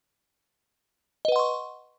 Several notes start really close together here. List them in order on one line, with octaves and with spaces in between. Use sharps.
D#5 B4 F#5 C6 C#6